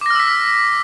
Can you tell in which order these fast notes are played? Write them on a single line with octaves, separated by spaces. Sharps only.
D6 A#6 F6 E6 B6